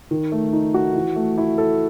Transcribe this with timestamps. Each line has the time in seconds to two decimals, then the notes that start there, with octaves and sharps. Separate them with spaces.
0.11 D#3
0.32 A3
0.53 D#4
0.74 F#4
0.95 E3
1.16 A3
1.38 E4
1.58 A4